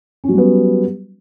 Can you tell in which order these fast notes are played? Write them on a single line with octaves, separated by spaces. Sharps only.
C#4 F#3 G3 B3